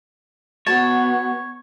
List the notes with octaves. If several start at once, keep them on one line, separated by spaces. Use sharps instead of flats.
B3 F#4 C#5 A5